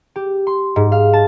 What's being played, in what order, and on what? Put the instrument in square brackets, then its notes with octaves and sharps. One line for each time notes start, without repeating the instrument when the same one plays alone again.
[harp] G4
C6
G#2
F5
A5